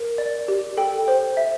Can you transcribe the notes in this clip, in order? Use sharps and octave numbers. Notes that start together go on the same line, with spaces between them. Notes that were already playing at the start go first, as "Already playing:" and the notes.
Already playing: A#4
D5
G4
A4 G5
C5
E5